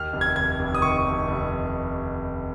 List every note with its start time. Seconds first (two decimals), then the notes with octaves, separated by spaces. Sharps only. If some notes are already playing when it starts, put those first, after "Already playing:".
Already playing: D#2 F6
0.13 F1
0.21 G#6
0.36 D#2 G#6
0.59 F1
0.75 D#6
0.82 D#3 C#6
1.05 F1
1.28 F1